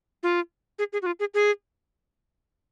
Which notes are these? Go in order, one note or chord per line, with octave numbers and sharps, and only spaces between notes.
F4
G#4
G#4
F#4
F4
G#4
G#4